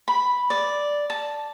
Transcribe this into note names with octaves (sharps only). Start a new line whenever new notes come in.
B5
D5
A5